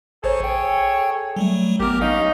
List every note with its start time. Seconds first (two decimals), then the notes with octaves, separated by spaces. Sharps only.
0.24 A1 G#4 A4 C5 C#5
0.44 G5
1.36 F#3 G3 A3
1.80 A1 B3 G4 A#4
2.01 C#4 D#4 F5